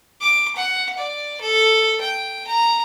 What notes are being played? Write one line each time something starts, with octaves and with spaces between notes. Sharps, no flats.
D6
F#5
D5
A4
G5
A#5